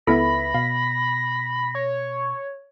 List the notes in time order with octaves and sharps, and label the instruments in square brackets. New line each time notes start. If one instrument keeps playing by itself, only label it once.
[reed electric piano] C#2 B4 E5 [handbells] B3 E4 A4 [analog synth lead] B5 [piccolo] A#6
[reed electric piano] B2 [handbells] F5
[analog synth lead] C#5